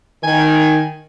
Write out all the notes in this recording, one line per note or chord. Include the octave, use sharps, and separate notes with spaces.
D#3 G#5